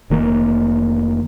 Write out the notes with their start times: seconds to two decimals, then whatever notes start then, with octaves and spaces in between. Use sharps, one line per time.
0.10 F1 D#3 A#3